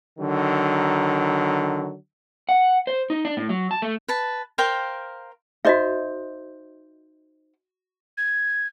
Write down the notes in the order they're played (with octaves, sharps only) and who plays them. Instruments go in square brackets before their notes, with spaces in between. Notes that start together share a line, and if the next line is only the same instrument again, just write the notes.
[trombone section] D3 D#3 F#3
[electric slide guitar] F#5
C5
D#4
D4
A2
F#3
A5
A3
[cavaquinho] B4 A5
A#4 C5 F5 G5
[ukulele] D#4 C5 [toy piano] F#4 D#5 E5
[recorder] G#6